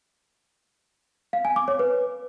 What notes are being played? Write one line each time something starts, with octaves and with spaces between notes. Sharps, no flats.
F5
G#5
D6
C#5
B4